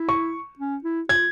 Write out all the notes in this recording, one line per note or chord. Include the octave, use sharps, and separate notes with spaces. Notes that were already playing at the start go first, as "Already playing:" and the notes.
Already playing: E4
C#6
C#4
E4
F4 G#6